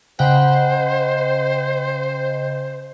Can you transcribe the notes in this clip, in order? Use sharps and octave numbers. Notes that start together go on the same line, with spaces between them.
C#3 C5 D#5 F#5 G5